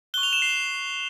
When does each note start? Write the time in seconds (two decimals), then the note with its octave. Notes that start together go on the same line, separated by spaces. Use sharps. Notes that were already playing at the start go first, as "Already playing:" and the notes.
0.14 C#6 F#6 G7
0.23 F7
0.33 E7
0.42 C7